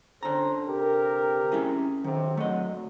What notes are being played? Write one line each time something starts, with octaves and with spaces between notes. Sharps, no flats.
D3 C#4 A4 C5 A#5
C3 G4 A#4
C#4 E4 G#4
B1 C3 D#3
G#1 D3 F#3 A3 D#5